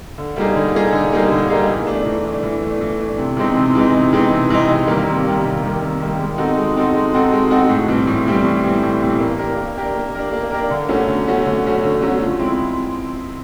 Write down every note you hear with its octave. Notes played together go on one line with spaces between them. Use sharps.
D3
G3 A#3 D#4 G#4
D3
G3 A#3 D#4 G#4
D3
G3 A#3 D#4 G#4
D3
G3 A#3 D#4 G#4
E3
A3 D4
E3
A3 D4
E3
A3 D4
E3
A3 D4
C3
E3 G#3 C4 D#4
C3
E3 G#3 C4 D#4
C3
E3 G#3 C4 D#4
C3
E3 G#3 C4 D#4
C3
D#3 G3 A#3
C3
D#3 G3 A#3
C3
D#3 G3 A#3
C3
D#3 G3 A#3
G#3
C4 D#4 F#4 A4
G#3
C4 D#4 F#4 A4
G#3
C4 D#4 F#4 A4
G#3
C4 D#4 F#4 A4
A2
E3 G3 C4
A2
E3 G3 C4
A2
E3 G3 C4
A2
E3 G3 C4
A#3
D4 G4 A#4
A#3
D4 G4 A#4
A#3
D4 G4 A#4
A#3
D4 G4 A#4
D3
F#3 A3 C#4 F#4
D3
F#3 A3 C#4 F#4
D3
F#3 A3 C#4 F#4
D3
F#3 A3 C#4 F#4
F3
G#3 C4 E4